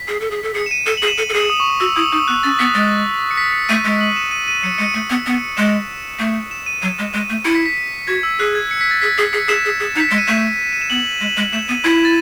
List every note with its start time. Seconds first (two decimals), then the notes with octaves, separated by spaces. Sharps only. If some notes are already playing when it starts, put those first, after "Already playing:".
Already playing: B6
0.08 G#4
0.20 A4
0.31 G#4
0.43 A4
0.54 G#4 C#7
0.66 E7
0.71 D#7
0.86 A4 E7
0.97 G#4 F#7
1.08 E7
1.18 A4 D#7
1.29 A4
1.33 G#4 C#7
1.50 D#6
1.60 C#6
1.70 D#6
1.80 F#4 E6
1.96 E4 D#6
2.12 D#4 D#6
2.28 B3 F#6
2.43 C#4 A6
2.59 B3 B6
2.74 G#3 A6
3.31 C#7
3.37 B6
3.53 C#7
3.69 A3 D#7
3.85 G#3
4.01 F#7
4.16 E7
4.31 D#7
4.48 D#7
4.63 F#3 C#7
4.78 G#3 C#7
4.94 A3 D#7
5.10 B3
5.26 B3
5.57 G#3 E7
6.19 A3
6.51 E7
6.66 D#7
6.82 F#3 D#7
6.99 G#3
7.13 G#3
7.30 A3
7.45 E4 C#7
7.55 B6
7.66 B6
8.08 F#4 G#6
8.23 E6
8.39 G#4 F#6
8.55 G#6
8.71 C#7
8.81 B6
8.91 A6
9.01 G#4 B6
9.18 G#4
9.33 G#4 C#7
9.48 G#4 E7
9.65 G#4
9.80 G#4
9.96 D#4
10.00 B6
10.09 G#3 C#7
10.18 D#7
10.27 A3 E7
10.73 D#7
10.81 E7
10.90 B3 F#7
11.21 G#3
11.37 G#3
11.45 F#7
11.52 A3 E7
11.68 B3 D#7
11.84 E4 B6
12.05 A6